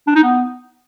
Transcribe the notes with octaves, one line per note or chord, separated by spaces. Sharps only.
D4
D#4
B3